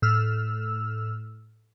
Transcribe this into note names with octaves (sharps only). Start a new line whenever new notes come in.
A2 E6 F6